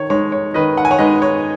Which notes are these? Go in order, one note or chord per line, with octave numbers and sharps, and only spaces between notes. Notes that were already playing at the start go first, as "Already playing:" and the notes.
Already playing: D#3 C#5
G#3 D#4 C#5
C#5
D#3 B4 D#5
F#5
G#5
C#5 F#5
G#3 D#4 B4 D#5
C#5